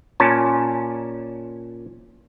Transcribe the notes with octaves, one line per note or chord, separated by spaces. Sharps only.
A#2 C#4 A5